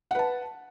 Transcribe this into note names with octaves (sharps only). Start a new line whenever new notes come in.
B4 F#5 A5